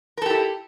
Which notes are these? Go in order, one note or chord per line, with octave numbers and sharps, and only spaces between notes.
E4 G4 A4 A#4